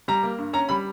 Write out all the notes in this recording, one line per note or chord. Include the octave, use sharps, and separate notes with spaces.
G3 A#5
A#3
G2
C#4 A#5
G3 B5